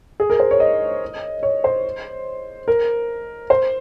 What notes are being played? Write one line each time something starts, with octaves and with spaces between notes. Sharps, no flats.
G#4
A#4
C5
C#5
D#5
C#5
C5
A#4
C5